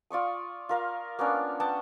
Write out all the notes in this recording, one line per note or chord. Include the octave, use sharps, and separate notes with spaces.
F4 D5 C#6 D#6
F4 A#4 F5
A#3 B3 C#4 D4
B3 F#5 G5 A5